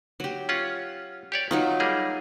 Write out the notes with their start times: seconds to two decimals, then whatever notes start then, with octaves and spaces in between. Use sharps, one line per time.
0.20 F#3 G4
0.49 C#4 F4 F#5
1.32 G4 C#5 D5
1.51 D#3 F#3 D#4 F4
1.80 G3 A#3 G#4